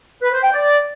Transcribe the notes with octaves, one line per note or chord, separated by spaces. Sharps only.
B4
C5
G5
D5